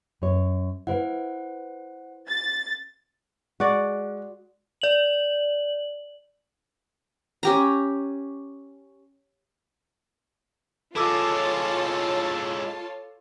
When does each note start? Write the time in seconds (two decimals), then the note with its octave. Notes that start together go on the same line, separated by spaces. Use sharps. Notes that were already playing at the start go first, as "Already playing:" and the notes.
0.22 F#2 C#5
0.87 E4 B4 C5 F5 F#5
2.29 A6
3.60 G#3 F#4 D5
4.82 D5 F#7
7.43 C#4 G4 A#5
10.96 G#3 E4 F4 A4 C#5 A5 D6 E6